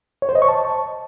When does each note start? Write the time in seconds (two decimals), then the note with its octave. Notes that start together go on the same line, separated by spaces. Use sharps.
0.22 C#5
0.29 C5
0.35 D#5
0.42 C#6
0.48 A5